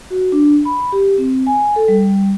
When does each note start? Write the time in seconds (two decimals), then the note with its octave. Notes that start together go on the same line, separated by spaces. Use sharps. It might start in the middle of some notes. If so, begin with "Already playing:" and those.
0.10 F#4
0.32 D4
0.65 B5
0.92 G4
1.18 C4
1.47 G#5
1.76 A4
1.88 G3